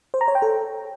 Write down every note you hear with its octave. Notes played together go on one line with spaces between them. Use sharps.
C5
A#5
C#5
G5
A4